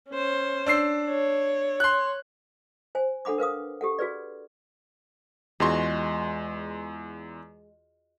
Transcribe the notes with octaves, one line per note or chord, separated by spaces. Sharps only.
C#4 C5
D4 E6 C7
C#5
C6 F#6
C5 G#5
D4 A4 F#5 B5 D6
A#4 B4 F5 D#6
G4 A4 F#5
F#4 G#4 B4 D5
E2 G#3 F4 F#4 C6